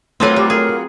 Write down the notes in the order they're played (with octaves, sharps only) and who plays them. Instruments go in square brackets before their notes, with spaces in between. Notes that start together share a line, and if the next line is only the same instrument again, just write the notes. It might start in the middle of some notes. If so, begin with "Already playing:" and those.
[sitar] F#3 A#3 F4 [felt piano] A3 C#5 [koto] C4 A4 B4
[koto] G3 [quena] G4
[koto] G#4 [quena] A#4